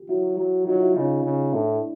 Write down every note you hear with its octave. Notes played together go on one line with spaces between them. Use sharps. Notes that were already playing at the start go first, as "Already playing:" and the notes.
Already playing: F4 G4
F#3 E4 F#4
F#3
F#3 D#4 F4
E4 F#4
C#3 D#4 F4
C#3
A2 D4 E4